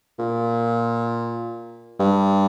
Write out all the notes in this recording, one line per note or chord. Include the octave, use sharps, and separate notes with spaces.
A#2
G2